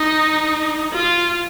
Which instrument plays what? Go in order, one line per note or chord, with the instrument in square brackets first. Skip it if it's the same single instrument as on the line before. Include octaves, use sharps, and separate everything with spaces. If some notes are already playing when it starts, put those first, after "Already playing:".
Already playing: [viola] D#4
F4